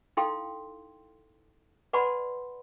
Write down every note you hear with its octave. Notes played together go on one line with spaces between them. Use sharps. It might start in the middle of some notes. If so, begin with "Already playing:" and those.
D#4 E4 A4 F5 G5 C6
B4 D5 F#5 A5 B5 C6